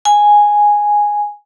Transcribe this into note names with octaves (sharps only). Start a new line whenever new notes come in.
G#5